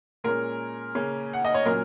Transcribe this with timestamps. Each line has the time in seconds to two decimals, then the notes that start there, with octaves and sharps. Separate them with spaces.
0.24 A#2 G#3 C#4 A#4
0.95 C#3 A#3 C#4
1.33 F#5
1.45 D#5
1.54 C#5
1.66 A#2 F#3 C#4 A#4